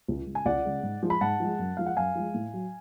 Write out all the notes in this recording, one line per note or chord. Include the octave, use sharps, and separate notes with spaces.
C#2
C#3 G#3
G#5
C#2 D5 F#5
C#3 G#3
G#2
F3 G#3
B5
G#2 F#5 A5
F3 G#3
F#2
F3 G#3 F5
F#5
F#2 F5 G#5
F3 G#3
A2
F#3